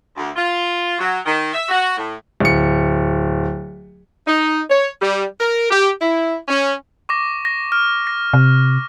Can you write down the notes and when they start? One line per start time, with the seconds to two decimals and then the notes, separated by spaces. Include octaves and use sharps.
0.16 D2
0.36 F4
0.99 F#3
1.25 D#3
1.53 E5
1.69 F#4
1.97 A2
2.40 D1 C#7
4.27 D#4
4.70 C#5
5.01 G3
5.39 A#4
5.70 G4
6.01 E4
6.48 C#4
7.09 C#6 D6 A#6
7.45 A#6
7.72 F6
8.07 A#6
8.33 C3